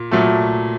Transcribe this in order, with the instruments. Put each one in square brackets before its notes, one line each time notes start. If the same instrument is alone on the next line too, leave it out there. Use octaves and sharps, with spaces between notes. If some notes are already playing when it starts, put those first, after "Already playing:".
Already playing: [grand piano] A#2
A#2 F#3 A3